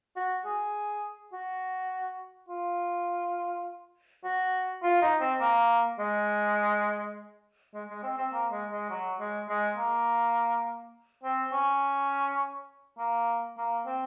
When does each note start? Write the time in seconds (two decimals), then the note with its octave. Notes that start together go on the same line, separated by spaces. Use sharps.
0.16 F#4
0.46 G#4
1.33 F#4
2.49 F4
4.24 F#4
4.83 F4
5.02 D#4
5.21 C4
5.40 A#3
5.99 G#3
7.74 G#3
7.89 G#3
8.03 C4
8.17 C4
8.33 A#3
8.52 G#3
8.72 G#3
8.90 F#3
9.20 G#3
9.49 G#3
9.78 A#3
11.24 C4
11.53 C#4
12.99 A#3
13.58 A#3
13.86 C4